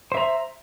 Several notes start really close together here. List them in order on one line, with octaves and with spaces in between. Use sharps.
C5 E5 A#5